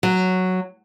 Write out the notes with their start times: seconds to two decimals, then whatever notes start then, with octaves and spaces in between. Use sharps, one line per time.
0.03 F#3